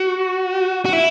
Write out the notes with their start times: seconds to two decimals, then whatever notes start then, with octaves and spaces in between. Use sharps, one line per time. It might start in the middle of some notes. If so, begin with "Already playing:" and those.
Already playing: F#4
0.85 F#4
0.93 E4